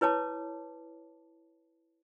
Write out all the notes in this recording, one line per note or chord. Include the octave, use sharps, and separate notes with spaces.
E4 B4 C#5 A5 D6